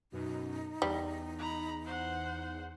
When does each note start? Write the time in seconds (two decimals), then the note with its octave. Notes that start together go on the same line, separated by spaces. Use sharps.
0.12 F#2 B2 D#4
0.82 E2 G3
1.39 A#5 B5
1.85 C5 F#5